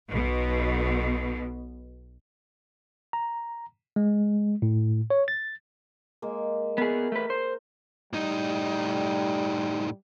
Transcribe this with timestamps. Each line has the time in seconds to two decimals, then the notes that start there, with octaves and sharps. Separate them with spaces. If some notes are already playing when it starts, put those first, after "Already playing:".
0.11 B1 B2
3.13 A#5
3.96 G#3
4.62 A2
5.10 C#5
5.28 A6
6.22 G#3 A#3
6.78 B3 G#4 A#4
7.12 A3 B4
7.30 C5
8.13 A2 G3 D#4